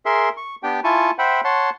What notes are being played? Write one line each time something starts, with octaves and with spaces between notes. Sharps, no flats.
G#4 A#4 E5 C6
C#6
B3 D4 G4 G5
E4 F4 G#5 A5 C#6
C5 E5 F#5 G5 B5
C#5 F#5 A5 C6